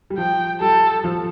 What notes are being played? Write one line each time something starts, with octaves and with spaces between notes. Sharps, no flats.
G3
F3 G5
G3 A4
F3